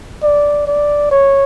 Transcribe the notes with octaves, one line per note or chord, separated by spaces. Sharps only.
D5
D5
C#5